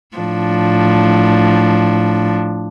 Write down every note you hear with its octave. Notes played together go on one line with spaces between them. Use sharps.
A2 F3 D4